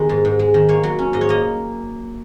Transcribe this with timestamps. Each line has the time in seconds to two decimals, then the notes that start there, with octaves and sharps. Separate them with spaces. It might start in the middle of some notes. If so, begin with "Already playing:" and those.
Already playing: D#3 G#3 B3
0.09 G#2
0.25 G#2
0.39 G#3
0.54 D#3
0.69 A#3 C#5
0.83 F#3
0.99 C#4
1.13 G#2 D#5
1.21 C#5
1.29 A#3 D#5